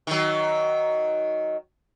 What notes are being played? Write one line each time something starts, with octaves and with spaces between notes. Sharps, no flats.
D#3 F#3